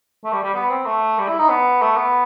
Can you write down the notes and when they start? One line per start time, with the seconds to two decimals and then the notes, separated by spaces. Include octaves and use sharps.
0.24 A3
0.33 G3
0.43 G3
0.55 B3
0.70 C4
0.86 A3
1.18 G3
1.28 E4
1.38 D#4
1.49 B3
1.82 A3
1.97 B3